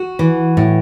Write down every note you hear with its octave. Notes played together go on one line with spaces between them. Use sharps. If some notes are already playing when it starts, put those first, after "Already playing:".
Already playing: F#4
E3
A2